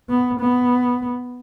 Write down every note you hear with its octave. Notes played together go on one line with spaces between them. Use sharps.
B3
B3